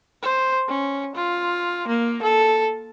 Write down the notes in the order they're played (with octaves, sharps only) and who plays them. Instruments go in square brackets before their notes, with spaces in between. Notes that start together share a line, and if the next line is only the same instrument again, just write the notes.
[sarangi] C5
C#4
F4
A#3
A4